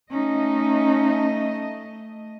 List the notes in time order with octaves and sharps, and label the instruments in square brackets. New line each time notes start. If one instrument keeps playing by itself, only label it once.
[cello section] A3 D#5 [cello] C#4 D#4